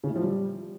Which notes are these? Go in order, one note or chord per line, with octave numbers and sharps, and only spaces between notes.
C#3
A2
F3
G3